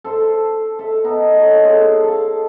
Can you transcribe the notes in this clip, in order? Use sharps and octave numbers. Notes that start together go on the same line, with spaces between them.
A4 C5 C6
A4 E5
B3 D#4
A4 C#5 D#5
G#4 A4 C6
A4 F5